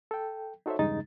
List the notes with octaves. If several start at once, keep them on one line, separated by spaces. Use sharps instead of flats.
A4 G5
D#4 F#4 A4 C5 C#5 E5
E2 G2 C#3 G#3 D#4 A6